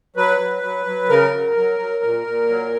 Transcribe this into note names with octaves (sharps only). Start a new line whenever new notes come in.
F#3 B4
F#3
F#3
F#3
C#3 A#4
F#3
F#3
F#3
A#2
A#2
F#3